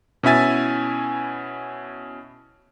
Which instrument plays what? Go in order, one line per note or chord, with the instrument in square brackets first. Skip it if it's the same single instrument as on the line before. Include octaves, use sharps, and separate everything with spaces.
[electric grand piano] B2 C#4 E4 E5 G#5 A6